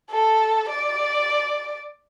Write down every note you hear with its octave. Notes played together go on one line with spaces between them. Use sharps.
A4
D5